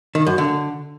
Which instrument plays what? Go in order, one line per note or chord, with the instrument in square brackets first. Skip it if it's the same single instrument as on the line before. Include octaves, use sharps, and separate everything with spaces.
[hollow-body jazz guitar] D#3
F#2
D3